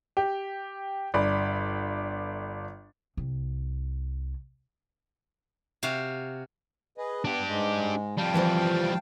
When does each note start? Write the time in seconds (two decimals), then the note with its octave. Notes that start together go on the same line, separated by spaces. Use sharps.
0.17 G4
1.14 G1 D5 B5
3.17 C2
5.83 C3 F#4 F5
6.98 G#4 B4 D#5
7.25 B3 D4 G4
7.48 G#2 G#3
8.18 F2 G3 F5 G5 A5
8.34 E3 F3 C5